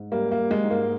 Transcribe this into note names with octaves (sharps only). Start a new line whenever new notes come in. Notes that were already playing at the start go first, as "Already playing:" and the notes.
Already playing: G#2
G3 A#3
A#3
G3
G#3
G#2
A#3